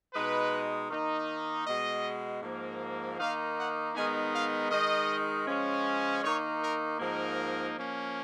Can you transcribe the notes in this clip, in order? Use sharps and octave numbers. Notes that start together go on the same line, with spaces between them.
B2 G#3 D#4 B4
D#3 A#3 D#4
B2 G#3 B3 D#5
G#2 F3 A#3
D#3 A#3 D#4 F5
F#5
D#3 G#3 B3 D#4 G#5
F5
D#3 G#3 D#4 D#5
F3 G#3 C#4
D#3 A#3 D#4 C#5
A#4
G#2 F3 A#3 D#4 A#4
F3 A#3 C#4